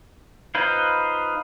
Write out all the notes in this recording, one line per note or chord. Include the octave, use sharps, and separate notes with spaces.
D#4 F4 B4 C5 F5